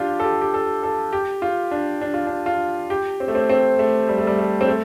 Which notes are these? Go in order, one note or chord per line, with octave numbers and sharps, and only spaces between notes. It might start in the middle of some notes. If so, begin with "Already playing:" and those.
Already playing: D4 F4 G4
A4
G4
G4
A4
A4
G4
F4
D4
D4
F4
D4
F4
G4
C4
A3
C4
C4
A3
G3
A3
G3
A3
C4
A3